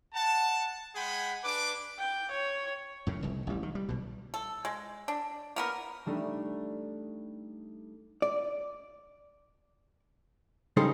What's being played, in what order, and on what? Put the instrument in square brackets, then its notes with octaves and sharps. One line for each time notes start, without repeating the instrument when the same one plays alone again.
[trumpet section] F#5 A5
G#3 G#4 F#5 G5 B5
D4 B4 D6
[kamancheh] G5
C#5
[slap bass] F#2 A2 C#3
F1 C2
A1 G3
D#3
G3
B1 B2
[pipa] A4
G#3
D4
A#3 B3 A#4
[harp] G3 A3 D4 D#4
[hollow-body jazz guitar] D5
C#3 G3 D#4 G#4 A4 C5